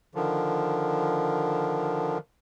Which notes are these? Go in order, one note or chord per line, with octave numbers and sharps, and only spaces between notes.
D3 D#3 F3